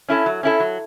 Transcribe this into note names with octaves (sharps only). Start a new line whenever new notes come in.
C#4 E4 A4
F#3
C#4 E4 A4
F#3